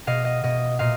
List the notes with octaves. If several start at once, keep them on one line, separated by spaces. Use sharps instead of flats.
B2 D#5 F5
D#5
B2 D#5
A#2 D#5 F5